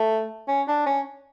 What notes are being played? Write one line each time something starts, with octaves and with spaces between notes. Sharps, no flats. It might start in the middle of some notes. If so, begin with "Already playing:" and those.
Already playing: A3
C#4
D4
C#4